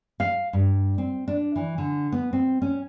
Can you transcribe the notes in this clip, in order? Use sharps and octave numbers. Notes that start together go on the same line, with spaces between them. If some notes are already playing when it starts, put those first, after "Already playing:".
F5
G2
C4
D4
E3
D3
B3
C4
C#4